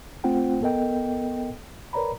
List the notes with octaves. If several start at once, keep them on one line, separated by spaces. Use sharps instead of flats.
A3 C4 F4 C5 F#5 G5
B3 A4 A#4 D#5 G5
A#4 B4 C#5 D5 A#5 B5